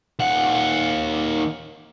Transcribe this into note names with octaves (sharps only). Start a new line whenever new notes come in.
D#2 F#5